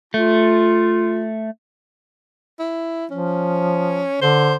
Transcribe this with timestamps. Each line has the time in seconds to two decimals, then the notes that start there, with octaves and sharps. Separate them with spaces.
0.14 A3 F4
2.59 E4
3.11 F3 C#4
4.21 D3 C5